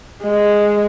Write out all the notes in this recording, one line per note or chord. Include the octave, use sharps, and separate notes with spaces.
G#3